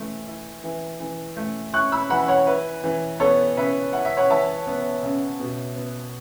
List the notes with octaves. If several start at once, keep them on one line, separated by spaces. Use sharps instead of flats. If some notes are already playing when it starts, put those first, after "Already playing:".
Already playing: E3 A3
E4
E3
E3
A3
E4 C#6 F#6
B5 E6
E3 F#5 B5
C#5 F#5
E4 B4
E3
B3 A4 C#5
C#3 B4 E5
E4 F#5
E5
C#5 F#5
E3 E5 A5
B3
C#3
B2
B3